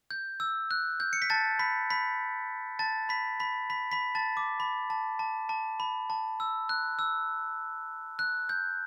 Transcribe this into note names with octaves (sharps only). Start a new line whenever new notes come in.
G6
E6
F#6
G6
C#7
B6
A5 A6
B5 B6
B5 B6
A5 A6
B5 B6
B5 B6
B5 B6
B5 B6
A5 A6
D6
B5
A5
A5
A5
B5
A5
E6
F#6
E6
F#6
G6